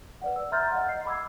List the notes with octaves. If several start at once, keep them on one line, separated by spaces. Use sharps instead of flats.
B4 D5 F#5
E6
E5 A#5 C6 F6 G6 A6
D#5 F5 F#5
C7
B5 D6 E6 G#6